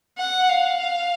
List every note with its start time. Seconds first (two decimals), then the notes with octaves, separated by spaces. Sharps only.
0.18 F#5
0.49 F5